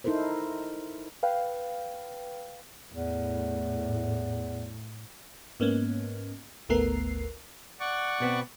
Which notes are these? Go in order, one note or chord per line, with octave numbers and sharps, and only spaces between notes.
D#4 E4 A4 A#4 C5
B4 F5 G5
E2 A2
G#2 A#3 B3 C#4
G#1 D2 A3 B3 A#4 C7
D5 F#5 C#6
B2 B3 C4